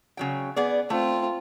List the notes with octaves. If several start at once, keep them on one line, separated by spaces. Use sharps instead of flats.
C#3 F#3 G5
B3 G#4 D5
A3 C4 F4